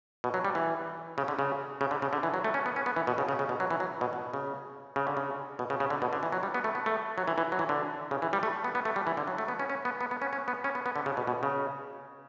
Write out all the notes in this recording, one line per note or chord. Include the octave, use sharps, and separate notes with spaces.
B2
F#3
G3
E3
C#3
D3
C#3
C#3
D3
C#3
D3
E3
F#3
A3
C#4
B3
C#4
B3
E3
B2
C#3
C#3
C#3
B2
F#3
E3
F#3
B2
B2
C#3
C#3
D3
C#3
B2
C#3
C#3
D3
B2
D3
E3
F#3
G3
B3
A3
B3
A3
F#3
E3
E3
F#3
E3
D3
C#3
E3
G3
A3
B3
B3
A3
G3
E3
D3
F#3
A3
B3
C#4
C#4
B3
B3
B3
C#4
C#4
B3
C#4
B3
B3
D3
C#3
B2
B2
C#3